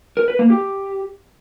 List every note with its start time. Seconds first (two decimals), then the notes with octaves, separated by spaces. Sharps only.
0.17 A#4
0.28 B4
0.39 A#3
0.50 G4